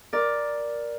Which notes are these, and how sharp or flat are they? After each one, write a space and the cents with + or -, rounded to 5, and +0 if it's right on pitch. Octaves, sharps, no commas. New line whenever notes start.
A#4 +10 D5 +0